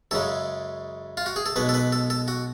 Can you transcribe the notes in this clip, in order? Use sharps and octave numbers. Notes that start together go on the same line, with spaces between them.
F#2 C#3 G#3 A4
F4
F#4
G#4
A4
B1 B2 G#3 B4
A4
B4
A4
A4
F#4